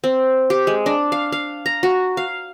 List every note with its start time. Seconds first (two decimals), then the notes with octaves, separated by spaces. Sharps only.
0.04 C4
0.50 G4
0.67 G#3
0.86 D4
1.12 F5
1.32 F5
1.66 A#5
1.83 F#4
2.17 F5